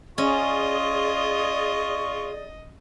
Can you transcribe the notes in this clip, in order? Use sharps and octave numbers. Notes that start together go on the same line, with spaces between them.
C#4 F4 G#4 D5 D#5 C#6